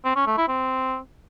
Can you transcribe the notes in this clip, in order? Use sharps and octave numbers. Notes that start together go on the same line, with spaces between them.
C4
C#4
A3
E4
C4